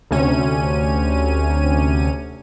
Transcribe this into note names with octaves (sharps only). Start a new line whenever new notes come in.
D2 C3 C#4 D#7